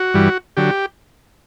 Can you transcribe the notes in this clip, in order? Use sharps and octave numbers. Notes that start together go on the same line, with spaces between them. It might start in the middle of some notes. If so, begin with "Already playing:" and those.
Already playing: F#4
G2 E3 G3
D3 F#3 G4